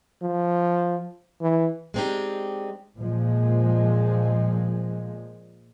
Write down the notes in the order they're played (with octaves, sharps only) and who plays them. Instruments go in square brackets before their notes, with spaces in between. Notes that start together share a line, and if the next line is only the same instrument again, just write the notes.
[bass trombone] F3
E3
[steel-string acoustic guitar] G#3 B3 C4 D4 D#4 G4
[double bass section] A#2 F3 G#3